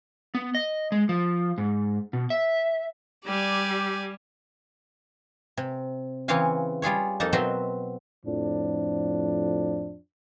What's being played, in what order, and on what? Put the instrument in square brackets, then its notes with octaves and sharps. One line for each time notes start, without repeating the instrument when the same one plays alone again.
[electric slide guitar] B3
D#5
G#3
F3
G#2
B2
E5
[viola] G3 [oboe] G4 [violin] D5 G#5
[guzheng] C3
C#3 E3 C4 C#5 F5 G#5
G3 F4 G#4 C#5
F2 A#3 D#4 A4 A5
B2 F#3 C4 E5 A#5 C6
[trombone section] F2 A2 F3 D4